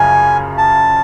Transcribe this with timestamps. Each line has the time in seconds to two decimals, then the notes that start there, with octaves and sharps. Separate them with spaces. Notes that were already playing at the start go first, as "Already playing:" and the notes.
Already playing: F#2 C#3 F3 G#5
0.58 A5